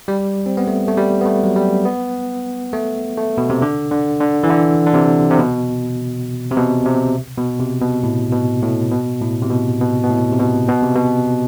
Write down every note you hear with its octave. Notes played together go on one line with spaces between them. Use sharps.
G3
C4
B3
A3
A3
G3
B3
A3
F#3
G3
B3
A3
A3
B2
C3
D3
D3
D3
E3
D3
D3
C3
C3
B2
C3
B2
C3
B2
C3
B2
A2
B2
A2
B2
A2
C3
B2
B2
B2
A2
C3
B2
B2
C3
B2